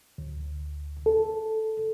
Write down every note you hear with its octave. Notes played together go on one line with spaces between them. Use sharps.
D2
A4